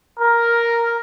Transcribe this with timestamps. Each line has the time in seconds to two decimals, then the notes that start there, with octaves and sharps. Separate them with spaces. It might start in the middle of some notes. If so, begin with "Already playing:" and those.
0.19 A#4